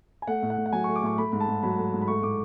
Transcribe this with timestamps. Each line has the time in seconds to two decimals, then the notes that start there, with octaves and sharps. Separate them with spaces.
0.22 G#5
0.27 A3 F#5
0.42 A2
0.50 F#5
0.57 A2
0.66 F#5
0.73 F#3 G#5
0.84 A3 C#6
0.96 D6
1.03 A2 C#6
1.18 A3 B5
1.32 G#2 B5
1.40 A5
1.48 G#2
1.63 F#3 B5
1.78 A3
1.93 G#2
2.02 B5
2.08 A3 C#6
2.23 A2 D6